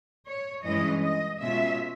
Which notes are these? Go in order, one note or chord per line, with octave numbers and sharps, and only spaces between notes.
C#5
G2 E3 G#3 C#4 D#5
D#5
B2 G#3 C#4 F4 E5